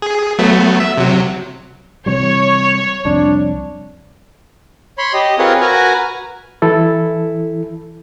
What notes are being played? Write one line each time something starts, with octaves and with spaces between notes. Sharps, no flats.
G#4
F#3 A3 B3
E5
C3 F#3
C3 E3 G3 C#5
C2 F2 D4
C#5 B5 C6
G4 D#5
C4 F4 G#4 A#4 B4 C#5
F#4 A#4 B4 G#5 A#5
E3 E4 A4